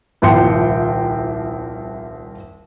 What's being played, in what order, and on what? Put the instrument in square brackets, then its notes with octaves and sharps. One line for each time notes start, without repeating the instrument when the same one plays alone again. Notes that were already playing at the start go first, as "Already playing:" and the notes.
[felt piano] D#1 C2 F3 G5 C6 C#7